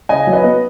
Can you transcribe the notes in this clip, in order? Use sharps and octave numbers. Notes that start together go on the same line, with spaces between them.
C#3 D#5 G#5
F#3
B4 D#5
B3